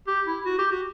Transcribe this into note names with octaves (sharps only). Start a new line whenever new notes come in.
G4
E4
F#4
G4
F#4